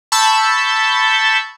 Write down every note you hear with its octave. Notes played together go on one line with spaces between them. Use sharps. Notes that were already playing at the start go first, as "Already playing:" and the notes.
A5 B5 C#6 E6 G6